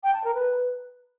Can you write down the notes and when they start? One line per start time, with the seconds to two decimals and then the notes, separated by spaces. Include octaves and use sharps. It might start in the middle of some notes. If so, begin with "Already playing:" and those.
0.04 G5
0.14 A5
0.24 A#4
0.34 B4